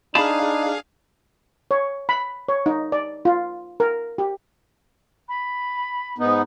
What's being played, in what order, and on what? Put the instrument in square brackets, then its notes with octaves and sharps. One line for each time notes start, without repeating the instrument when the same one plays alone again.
[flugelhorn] D4 [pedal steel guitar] D#4 [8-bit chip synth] G#4 F5 [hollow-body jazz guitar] A5 B5
[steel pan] C#5
B5
C#5
D#4
D5
F4
A#4
G4
[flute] B5
[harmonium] G#2 B3 D#4